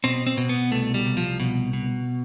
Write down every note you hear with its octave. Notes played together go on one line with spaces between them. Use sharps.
B2 C4
C4
B2
B3
C2 A3
G3
C2
F3
B2
B2